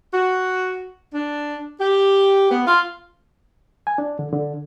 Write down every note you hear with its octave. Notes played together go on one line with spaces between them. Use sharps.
F#4
D4
G4
B3
F4
G#5
D4
D3
D3